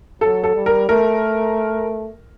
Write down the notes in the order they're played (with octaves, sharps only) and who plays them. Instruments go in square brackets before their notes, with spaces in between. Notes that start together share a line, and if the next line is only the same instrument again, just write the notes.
[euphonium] F#3 [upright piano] A4
[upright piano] A4
[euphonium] G3
[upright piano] A#4
[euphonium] A3 [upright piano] A#4